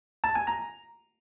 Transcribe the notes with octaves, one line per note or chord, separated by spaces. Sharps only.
A5
G#5
A#5